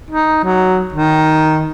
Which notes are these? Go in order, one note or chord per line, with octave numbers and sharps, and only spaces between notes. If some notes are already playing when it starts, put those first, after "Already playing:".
D#4
F#3
D#3